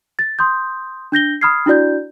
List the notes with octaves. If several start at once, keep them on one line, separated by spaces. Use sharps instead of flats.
A6
C6 D#6 G6
D4 G6 A#6 G7
B5 D#6 F6 G#6 C7
D4 E4 F#4 D5 G6